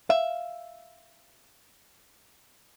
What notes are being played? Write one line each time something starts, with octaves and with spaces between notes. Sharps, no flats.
E5 F5